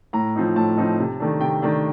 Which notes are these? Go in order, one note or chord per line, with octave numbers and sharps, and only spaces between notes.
A2 A#5
F3 C4 D#4
A2 A5
F3 C4 D#4
C3
D#3 A3 D4
C3 G5
D#3 A3 D4